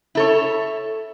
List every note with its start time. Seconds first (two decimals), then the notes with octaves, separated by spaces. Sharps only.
0.15 E4 A4 C#5